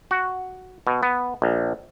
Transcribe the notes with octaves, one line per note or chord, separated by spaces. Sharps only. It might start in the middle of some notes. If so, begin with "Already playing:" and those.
F#4
B2
B3
A#1